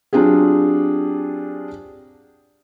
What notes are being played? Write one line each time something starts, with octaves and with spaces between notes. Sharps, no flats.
F#3 C4 D4 F4 G4 G#4